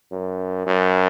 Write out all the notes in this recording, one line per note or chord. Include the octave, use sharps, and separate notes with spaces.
F#2
F#2